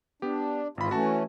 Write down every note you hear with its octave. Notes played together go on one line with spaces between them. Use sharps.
B3 D4 G4
G#1 G#2 E3 F4 B5
E3 A3 C#4 F#4 A5